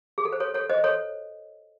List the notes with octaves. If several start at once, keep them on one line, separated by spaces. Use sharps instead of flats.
G#4
A4
C5
A4 C#5
A4 C#5
C5 D#5
A4 C#5